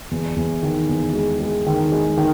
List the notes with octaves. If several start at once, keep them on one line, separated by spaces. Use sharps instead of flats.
E2
E2
D#3
E2
G#3
G#3
D#3
G#3
D#3